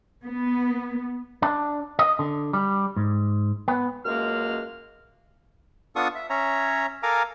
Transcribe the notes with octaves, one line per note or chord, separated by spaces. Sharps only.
B3
D4
D#5
D3
G3
G#2
B3
C#2 F#2 G#3 A#3 F6
B3 D4 F4 A4 C#6 D#6
E5
C#4 C#5 E5 A#5
A4 A#4 F5 G#5 A#5 D6